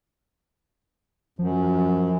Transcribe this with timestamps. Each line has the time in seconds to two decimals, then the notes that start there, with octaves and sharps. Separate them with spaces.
1.39 F#2 F3